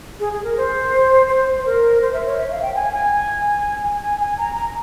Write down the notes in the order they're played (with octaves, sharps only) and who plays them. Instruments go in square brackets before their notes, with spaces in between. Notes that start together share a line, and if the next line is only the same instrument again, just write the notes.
[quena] G#4
G#4
A#4
C5
C5
C5
A#4
C5
E5
C#5
E5
F5
G5
G#5
G#5
G#5
G#5
G#5
A#5
A#5